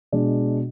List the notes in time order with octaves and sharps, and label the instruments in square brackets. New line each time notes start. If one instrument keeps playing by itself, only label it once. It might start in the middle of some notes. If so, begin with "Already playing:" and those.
[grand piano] B2 G#3 D4